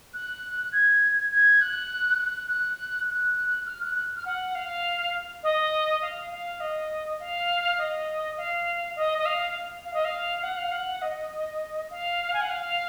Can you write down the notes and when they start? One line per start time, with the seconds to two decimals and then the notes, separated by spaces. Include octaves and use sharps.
0.14 F#6
0.72 G#6
1.32 G#6
1.61 F#6
2.19 F#6
2.48 F#6
3.08 F#6
3.66 F6
3.81 F#6
3.96 F#6
4.16 F6
4.26 F#5
4.55 F5
5.43 D#5
6.02 F5
6.31 F5
6.60 D#5
7.20 F5
7.78 D#5
8.37 F5
8.96 D#5
9.18 D#5
9.26 F5
9.85 F5
9.94 D#5
10.05 F5
10.43 F#5
10.57 F5
10.71 F#5
11.02 D#5
11.90 F5
12.34 G#5
12.41 F#5
12.50 F5